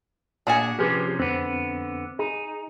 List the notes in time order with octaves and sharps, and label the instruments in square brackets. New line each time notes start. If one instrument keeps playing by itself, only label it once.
[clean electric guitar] A#2 F#4 G#4 [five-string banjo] D4 F#5 G#5
[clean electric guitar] C3 F3 C#4 [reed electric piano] G4 G#4 B4
[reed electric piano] F2 C4 [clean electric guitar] D3 B3
[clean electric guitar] D#4 [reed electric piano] G#4